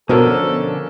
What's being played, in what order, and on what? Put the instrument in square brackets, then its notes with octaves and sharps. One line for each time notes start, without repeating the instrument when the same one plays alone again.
[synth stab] B2 [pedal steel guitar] D3 F3 C#4 [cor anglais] A4 [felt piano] A#4 C5